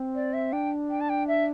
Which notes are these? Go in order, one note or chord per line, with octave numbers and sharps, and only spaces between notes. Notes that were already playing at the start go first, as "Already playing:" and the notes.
Already playing: C4
D5
E5
D4 G5
G5
A5
G5
E5